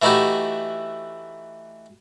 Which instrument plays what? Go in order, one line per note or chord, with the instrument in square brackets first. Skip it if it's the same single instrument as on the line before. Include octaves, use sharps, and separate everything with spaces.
[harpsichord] E3 A3 D#4 E4 F#4 G4